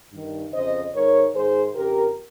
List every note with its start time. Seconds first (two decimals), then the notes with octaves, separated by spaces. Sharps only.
0.12 G2 D#3
0.53 F2 C#3 C5 D#5
0.93 G#2 D#3 A#4 C#5
1.35 G#2 D#3 G#4 C5
1.75 F2 C#3 G4 A#4